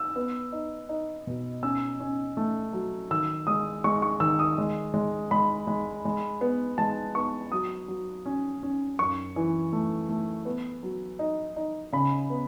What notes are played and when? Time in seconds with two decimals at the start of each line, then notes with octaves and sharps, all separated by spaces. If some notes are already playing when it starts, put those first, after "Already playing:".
Already playing: E6
0.16 B3
0.52 D#4
0.89 D#4
1.27 B2
1.63 C#4 E6
2.00 C#4
2.37 A3
2.73 F#3
3.11 D#3 E6
3.47 G#3 D#6
3.84 G#3 C#6
4.02 C#6
4.20 D#3 E6
4.39 D#6
4.58 G#3
4.94 G#3
5.31 G#3 B5
5.67 G#3
6.05 G#3
6.41 B3
6.78 G#3 A5
7.15 B3 C#6
7.52 F#3 D#6
7.88 F#3
8.26 C#4
8.63 C#4
8.99 F#2 C#6
9.36 E3
9.73 A3
10.09 A3
10.45 B3
10.83 F#3
11.19 D#4
11.56 D#4
11.93 C#3 B5
12.30 B3